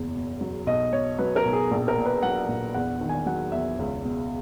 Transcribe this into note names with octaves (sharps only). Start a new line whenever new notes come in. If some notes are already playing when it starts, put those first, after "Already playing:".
Already playing: F#1 E2
B2
F#3
B1 D#5
B2 C#5
F#3 B4
A#4
B1
G#4
A#1
A#4
A#2
B4
F#3 F#5
A#1
E2 F#5
D#3
G#5
F#3 F#5
E2 E5
C#2
B2